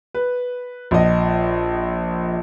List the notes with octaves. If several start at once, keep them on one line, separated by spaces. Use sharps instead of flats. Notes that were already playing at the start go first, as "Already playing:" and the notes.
B4
A#1 D#5